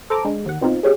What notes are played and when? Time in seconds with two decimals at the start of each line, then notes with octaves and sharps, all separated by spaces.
0.10 A4 C5 A#5 D6
0.25 D3 G#3
0.46 D#2 F#5
0.61 B2 C4 D#4 F4
0.83 G#3 C#4 G4 G#4